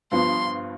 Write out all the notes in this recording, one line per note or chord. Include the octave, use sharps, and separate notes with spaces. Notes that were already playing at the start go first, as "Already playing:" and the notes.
G2 F3 B3 C6